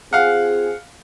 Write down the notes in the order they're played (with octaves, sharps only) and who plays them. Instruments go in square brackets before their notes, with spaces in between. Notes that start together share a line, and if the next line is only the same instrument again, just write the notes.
[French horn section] C4 F4 G#4 [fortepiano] F5 F#5